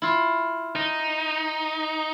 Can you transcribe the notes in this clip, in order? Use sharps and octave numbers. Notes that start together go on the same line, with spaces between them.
E4 F4
D#4